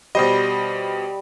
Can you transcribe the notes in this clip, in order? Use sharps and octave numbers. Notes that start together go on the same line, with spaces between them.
B2 G3 C5 D#5